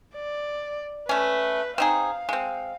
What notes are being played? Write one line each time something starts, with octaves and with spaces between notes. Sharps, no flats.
D5
A3 C#4 B4
C4 D#4 G#4 F5
G#3 C4